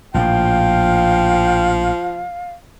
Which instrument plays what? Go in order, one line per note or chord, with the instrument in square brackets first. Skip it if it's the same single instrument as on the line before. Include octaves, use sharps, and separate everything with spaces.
[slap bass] A#1 A2 [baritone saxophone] F3 [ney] F5 [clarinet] G5